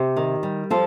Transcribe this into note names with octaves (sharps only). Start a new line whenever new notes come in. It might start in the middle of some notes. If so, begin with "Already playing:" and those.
Already playing: C3 G4
D#3
G3
F3 F4 A4